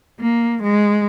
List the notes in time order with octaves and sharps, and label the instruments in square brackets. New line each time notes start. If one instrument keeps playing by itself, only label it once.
[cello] A#3
G#3